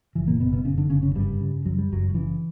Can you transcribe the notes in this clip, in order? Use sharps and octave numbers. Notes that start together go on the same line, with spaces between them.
F#1 E3
A#2 A#3
F#1 B2 B3
B2 B3
F#1 C#3 C#4
D3 D4
F#1 C#3 C#4
C#3 C#4
G2 C#3 G3
C#3
F#2 F#3
G3
F#1 F#2 F#3
F#3
C#3 E3